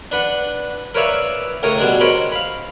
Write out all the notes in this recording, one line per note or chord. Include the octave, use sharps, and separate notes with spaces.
D4 B4 F#5
A#4 B4 C#5 D5 E5 F5
C#2 A2 A#4 C#5 D#6
B2 G3 G#3 D4
A#4 C5 C#5 D#5 G5 B5
F5 B5